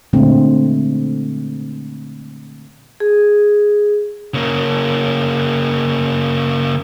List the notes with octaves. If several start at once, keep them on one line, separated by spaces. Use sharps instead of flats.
A#2 D3 F#3 G#3 A3 C4
G#4
C#3 A#3